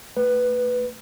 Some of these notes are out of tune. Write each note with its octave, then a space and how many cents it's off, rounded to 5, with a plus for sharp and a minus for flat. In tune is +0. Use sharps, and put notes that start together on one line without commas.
A3 +25 B4 +0